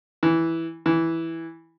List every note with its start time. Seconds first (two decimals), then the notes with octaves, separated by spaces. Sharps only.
0.23 E3
0.86 E3